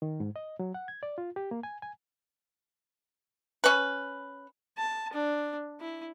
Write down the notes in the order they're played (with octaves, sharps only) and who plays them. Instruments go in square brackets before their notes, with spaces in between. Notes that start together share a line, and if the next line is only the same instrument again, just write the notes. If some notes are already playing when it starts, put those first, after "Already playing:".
[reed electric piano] D#3
G#2
D#5
F#3
F#5
G#6
D5
F4
G4
A#3
G#5
G#5
[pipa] C#4 B4
[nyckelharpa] A5
D4
E4